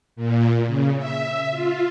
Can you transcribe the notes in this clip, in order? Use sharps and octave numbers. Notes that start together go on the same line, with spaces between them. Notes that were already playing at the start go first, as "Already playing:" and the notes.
A#2
C#3
E5
F4